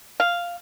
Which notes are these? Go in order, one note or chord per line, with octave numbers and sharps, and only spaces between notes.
F5